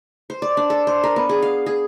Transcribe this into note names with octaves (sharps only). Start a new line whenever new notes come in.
C5
D5
D4
A4
C5
A#4
B3
G#4
F5
G#4